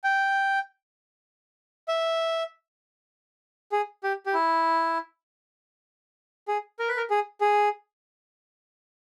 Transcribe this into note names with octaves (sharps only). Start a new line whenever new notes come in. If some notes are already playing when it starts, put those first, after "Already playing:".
G5
E5
G#4
G4
G4
E4
G#4
A#4
B4
A#4
G#4
G#4